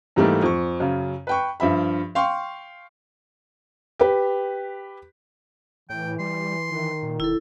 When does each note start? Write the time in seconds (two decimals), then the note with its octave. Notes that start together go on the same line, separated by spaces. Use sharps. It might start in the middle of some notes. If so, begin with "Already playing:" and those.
0.16 G#2 E3 G3 A3 A#3 D#4
0.42 F2 C#6
0.80 F#2 C#3
1.27 B4 G5 C#6
1.60 G2 F3 E5 B5
2.15 F5 G5 C6 C#6
3.99 G4 B4
5.90 A2 E3 G5
6.20 G3 C6
6.72 D#3 E3
7.02 A#2
7.20 E1 E4 A4